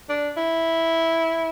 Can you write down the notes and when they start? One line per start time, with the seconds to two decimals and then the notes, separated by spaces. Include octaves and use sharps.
0.09 D4
0.37 E4